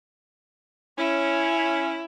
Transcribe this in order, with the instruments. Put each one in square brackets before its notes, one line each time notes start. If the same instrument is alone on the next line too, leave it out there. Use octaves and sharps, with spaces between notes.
[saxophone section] C#4 [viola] E4